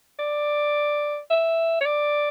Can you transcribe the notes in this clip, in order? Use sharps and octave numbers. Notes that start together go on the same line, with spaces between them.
D5
E5
C#5
D5